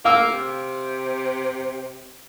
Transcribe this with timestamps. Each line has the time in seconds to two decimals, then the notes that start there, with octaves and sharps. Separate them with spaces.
0.05 A#3 F5 E6
0.32 C3